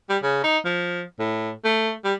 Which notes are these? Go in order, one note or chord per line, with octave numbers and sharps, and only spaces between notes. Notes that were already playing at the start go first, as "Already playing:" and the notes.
G3
C#3
D#4
F3
A2
A3
G3